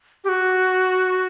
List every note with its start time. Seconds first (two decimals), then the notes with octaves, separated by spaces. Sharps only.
0.24 G4
0.29 F#4